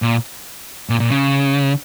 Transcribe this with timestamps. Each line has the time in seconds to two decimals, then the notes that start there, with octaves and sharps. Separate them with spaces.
0.02 A#2
0.90 A#2
1.00 A#2
1.10 C#3